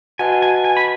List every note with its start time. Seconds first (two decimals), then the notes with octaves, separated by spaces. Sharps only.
0.19 F#4 B4 D#5 F#5 G#5 A5
0.42 G#5
0.64 G#5
0.77 B5